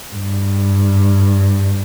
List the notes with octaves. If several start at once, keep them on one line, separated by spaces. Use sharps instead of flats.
G2